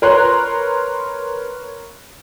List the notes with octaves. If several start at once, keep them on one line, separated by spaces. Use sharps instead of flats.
A#4 B4 C#5 A#5 C6 F#6